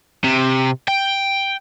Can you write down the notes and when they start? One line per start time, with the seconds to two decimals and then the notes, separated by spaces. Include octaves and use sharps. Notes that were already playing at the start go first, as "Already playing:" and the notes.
0.24 C3
0.88 G5